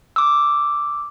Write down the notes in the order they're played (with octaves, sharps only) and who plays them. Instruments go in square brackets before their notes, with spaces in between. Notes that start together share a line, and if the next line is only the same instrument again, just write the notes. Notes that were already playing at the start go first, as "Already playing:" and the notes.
[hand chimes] D6 E6